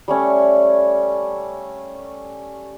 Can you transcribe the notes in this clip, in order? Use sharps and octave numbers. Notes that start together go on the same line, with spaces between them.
G3 A3 C#4